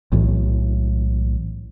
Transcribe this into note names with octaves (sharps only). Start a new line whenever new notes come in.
B1 A2 E3